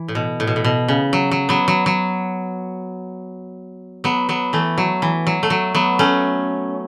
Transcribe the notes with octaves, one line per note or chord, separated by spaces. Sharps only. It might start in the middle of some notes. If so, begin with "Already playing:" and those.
Already playing: E3
A2
B2
A2
B2
A2
B2
C#3
F#3
F#3
F#3 B3
F#3
F#3
F#3 B3
F#3 B3
E3 A3
F#3
E3
F#3
A3
F#3
F#3 B3
A3 C#4